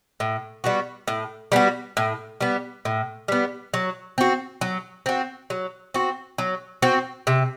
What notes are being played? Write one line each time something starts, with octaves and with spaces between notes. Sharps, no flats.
A2
G3 B3 F#4
A2
G3 B3 F#4
A2
G3 B3
A2
G3 B3
F#3
C4 F#4
F#3
C4 F#4
F#3
C4 F#4
F#3
C4 F#4
C3